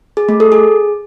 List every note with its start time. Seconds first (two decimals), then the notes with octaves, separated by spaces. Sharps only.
0.17 G#4
0.29 A3
0.40 A4
0.52 G#4